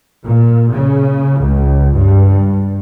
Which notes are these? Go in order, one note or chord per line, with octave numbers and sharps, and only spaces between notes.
A#2
C#3
C#2
G2